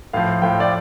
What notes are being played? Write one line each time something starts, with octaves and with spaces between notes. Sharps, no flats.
A2 F3 F5
A2 F3 G5
D5